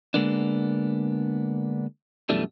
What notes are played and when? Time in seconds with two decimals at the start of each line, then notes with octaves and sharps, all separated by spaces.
0.14 D3 G#3 A#3 B3 D4
2.29 F#2 B2 E3 G3 A3 D4